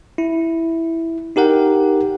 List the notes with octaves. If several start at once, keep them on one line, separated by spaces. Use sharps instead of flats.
E4
D#4 G4 A#4 F#5 G5